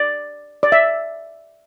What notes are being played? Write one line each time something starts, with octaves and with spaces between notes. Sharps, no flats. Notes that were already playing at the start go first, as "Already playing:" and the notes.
Already playing: D5
D5
E5